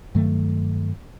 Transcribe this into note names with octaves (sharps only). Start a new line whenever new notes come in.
G2 D#3 F#3 A3